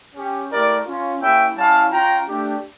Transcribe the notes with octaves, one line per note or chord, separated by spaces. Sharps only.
C#4 G4
A3 E4 G4 A#4 D5
C#4 F4
A#3 C#4 E4 G4 E5 G5
G3 C#4 E4 F5 A5
C#4 F4 G5 A#5
A3 D4 G4